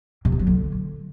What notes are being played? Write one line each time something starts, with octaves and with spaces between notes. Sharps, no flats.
C3
B3
F#3
D3